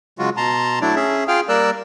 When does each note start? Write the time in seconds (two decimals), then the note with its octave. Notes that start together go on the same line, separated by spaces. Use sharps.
0.19 C#3 F#3 G#3 F4 F#4
0.37 B2 A5 A#5 C6
0.81 F#3 A3 D4 E4 D5
0.95 C#4 G#4 E5
1.28 F4 G#4 F5 G5 F6
1.49 G3 A#3 A#4 D5 E6 F#6